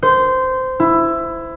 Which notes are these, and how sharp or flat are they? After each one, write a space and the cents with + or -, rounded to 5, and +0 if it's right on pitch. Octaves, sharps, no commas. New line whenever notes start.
C5 -15
E4 +15